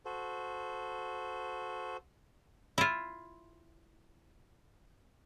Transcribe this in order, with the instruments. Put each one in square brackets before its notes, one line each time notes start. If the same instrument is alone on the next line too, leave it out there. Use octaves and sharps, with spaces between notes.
[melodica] F#4 A4 C5
[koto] E4 F4